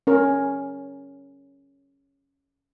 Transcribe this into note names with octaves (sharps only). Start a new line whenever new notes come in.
C#4 A#4